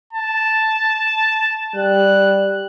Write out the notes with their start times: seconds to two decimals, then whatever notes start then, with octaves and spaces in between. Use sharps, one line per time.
0.13 A5
1.76 G3 F#6